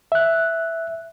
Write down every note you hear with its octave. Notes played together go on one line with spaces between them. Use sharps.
E5 F#6